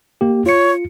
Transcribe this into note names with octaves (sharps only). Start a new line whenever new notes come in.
A#3 G4
F4 C#5 C#7